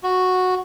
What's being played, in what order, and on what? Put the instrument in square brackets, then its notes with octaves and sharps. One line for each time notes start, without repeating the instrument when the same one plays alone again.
[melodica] F#4